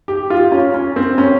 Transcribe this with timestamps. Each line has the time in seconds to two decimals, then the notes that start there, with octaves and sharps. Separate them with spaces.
0.08 G4
0.30 F4
0.52 C#4
0.74 C#4
0.96 C4
1.18 C#4